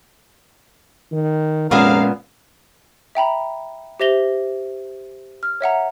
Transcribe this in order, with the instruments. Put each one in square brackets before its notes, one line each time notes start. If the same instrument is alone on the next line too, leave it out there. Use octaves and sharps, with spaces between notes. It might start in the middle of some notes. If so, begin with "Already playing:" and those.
[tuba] D#3
[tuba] F1 [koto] A#2 B3 E5 [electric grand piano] G#3 C#4 [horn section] A#4 F5
[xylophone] E5 G5 A#5 B5
G4 C5 E5 A#6 F7 G7
F6
C#5 E5 F#5 A#5